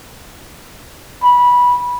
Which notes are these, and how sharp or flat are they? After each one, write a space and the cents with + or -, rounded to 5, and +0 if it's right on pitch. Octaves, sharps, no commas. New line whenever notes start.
B5 -15